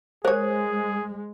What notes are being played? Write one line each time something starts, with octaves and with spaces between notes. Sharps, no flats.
G#3 G#4 A#4 C5 C#5